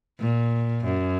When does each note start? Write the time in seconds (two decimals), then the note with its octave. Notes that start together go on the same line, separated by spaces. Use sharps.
0.20 A#2
0.85 F#2